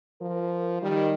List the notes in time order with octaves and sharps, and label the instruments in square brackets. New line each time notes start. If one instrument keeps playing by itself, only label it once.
[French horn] F3 [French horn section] A#4
[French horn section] D#3 [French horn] G3